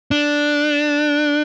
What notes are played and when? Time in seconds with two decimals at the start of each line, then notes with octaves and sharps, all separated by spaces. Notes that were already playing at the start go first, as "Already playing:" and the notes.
0.11 D4